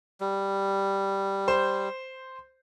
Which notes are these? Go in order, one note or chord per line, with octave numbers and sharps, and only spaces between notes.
G3
C5